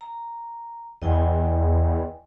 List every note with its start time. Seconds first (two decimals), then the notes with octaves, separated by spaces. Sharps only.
0.01 A#5
1.02 E2 D#5 G5 G#5